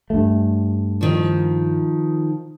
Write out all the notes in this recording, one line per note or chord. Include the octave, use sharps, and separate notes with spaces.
G2 A3
D#3 F3